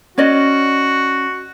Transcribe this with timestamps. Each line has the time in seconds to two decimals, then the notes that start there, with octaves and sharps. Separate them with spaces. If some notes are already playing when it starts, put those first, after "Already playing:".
0.18 C#4 F#4 D5 D#5